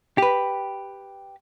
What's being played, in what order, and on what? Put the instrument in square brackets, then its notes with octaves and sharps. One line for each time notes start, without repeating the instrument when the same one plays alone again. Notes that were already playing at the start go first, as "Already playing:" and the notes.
[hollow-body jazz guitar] G4 B4